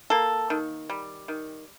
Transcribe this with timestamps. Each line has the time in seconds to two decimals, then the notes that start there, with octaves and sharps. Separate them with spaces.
0.10 A#3 A4
0.50 D#3
0.89 G3
1.28 D#3